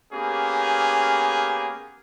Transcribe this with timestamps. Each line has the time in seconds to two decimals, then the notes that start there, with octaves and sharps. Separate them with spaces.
0.12 A#3 B3 C#4 G4 G#4